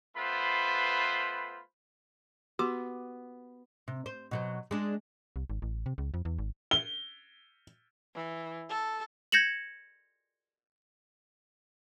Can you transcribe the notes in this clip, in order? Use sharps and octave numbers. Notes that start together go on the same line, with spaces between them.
A3 B3 F4 B4 C5 B5
B3 F#4 G4 C6 D6
C3
C5
B2 F#3 C5
G#3 D4
C2
G#1
A1
C3
C#2
F2
E2
G#1
G7
E3
A4
G6 G#6 A#6 C#7 E7 F#7